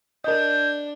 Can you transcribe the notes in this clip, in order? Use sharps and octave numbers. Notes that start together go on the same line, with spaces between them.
D4 A#4 D#5 G6